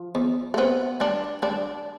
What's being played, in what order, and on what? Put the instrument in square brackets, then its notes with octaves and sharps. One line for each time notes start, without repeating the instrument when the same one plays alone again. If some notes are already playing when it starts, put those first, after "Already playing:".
Already playing: [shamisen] F3
[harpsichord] E2
[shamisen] A3
[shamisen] B3 [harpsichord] C4
[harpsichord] G3 [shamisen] D4
[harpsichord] G3 [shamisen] D4